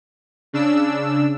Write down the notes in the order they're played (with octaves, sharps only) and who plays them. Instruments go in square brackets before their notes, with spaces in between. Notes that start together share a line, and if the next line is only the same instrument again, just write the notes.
[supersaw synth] C#3 D4 E6